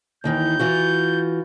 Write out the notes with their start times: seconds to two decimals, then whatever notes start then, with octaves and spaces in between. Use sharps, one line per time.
0.24 D#2 D#3 E3 G6
0.59 E3 F4 F#4